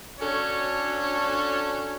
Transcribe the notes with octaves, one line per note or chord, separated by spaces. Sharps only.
C#4 D4 F#4 A4 C#5